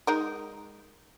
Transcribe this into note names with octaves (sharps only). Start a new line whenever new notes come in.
G#3 D#4 A#4